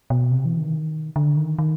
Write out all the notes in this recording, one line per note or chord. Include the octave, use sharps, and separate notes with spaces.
B2
C3
E3
D#3
D3
D#3
D#3